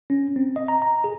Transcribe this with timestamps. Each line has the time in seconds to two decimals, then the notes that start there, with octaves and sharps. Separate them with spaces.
0.10 C#4
0.36 C4
0.56 D#5
0.68 A#5
0.82 A#5
1.04 G#4